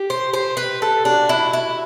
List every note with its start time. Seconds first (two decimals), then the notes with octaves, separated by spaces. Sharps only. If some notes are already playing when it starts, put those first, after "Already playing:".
Already playing: G4
0.10 C5
0.34 G4 C5
0.57 B4
0.82 A4
1.05 D4 F#4
1.29 E4
1.53 E4